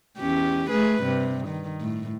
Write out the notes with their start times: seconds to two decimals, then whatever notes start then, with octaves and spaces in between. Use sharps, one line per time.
0.19 E2 C#4 G4
0.71 A3 G#4 B4
1.03 G2 C3
1.47 D#3
1.81 A2